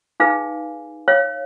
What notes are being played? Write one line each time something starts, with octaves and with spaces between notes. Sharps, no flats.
D#4 G#4 B4 F5 G#5
C#5 F5